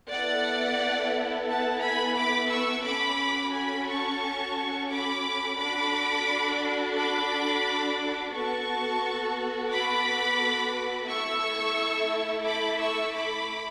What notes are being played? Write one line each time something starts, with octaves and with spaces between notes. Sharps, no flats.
B3 E4 A4 D5 F#5
F#5 A5
G#5 B5
B5 D6
C#6 E6
C#4 F#4 A4 B5 D6
G#5 B5
A5 C#6
B5 D6
D4 F#4 A4 B5 D6
B5 D6
B3 F#4 A4 A5 C#6
B5 D6
A3 E4 A4 C#6 E6
B5 D6
C#6 E6
B5 D6